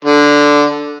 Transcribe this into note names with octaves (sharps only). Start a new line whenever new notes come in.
D3